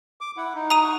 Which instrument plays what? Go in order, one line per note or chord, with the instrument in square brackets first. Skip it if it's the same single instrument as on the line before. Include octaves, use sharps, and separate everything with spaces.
[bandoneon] D6
E4 F#5
D#4
[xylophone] A#5 D#6 D#7
[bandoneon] F#5 C#6